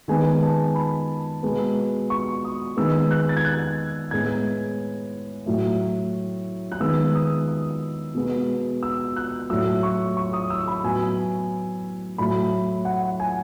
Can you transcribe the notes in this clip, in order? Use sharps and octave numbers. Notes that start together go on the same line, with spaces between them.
D#3 G#3 B3 G#5
A5
B5
B2 G#3 B3
C#6
D#6
D#3 G#3 B3 E6
F#6
A6
G#6
F#6
A2 G#3 B3 G#6
A2 F#3 A3
F#6
D#3 G#3 B3 E6
D#6
D#6
B2 G#3 B3
E6
F#6
A2 F#3 A3 E6
C#6
C#6
D#6
E6
B5
A2 F#3 B3 G#5
A2 F#3 A3 B5
F#5
G#5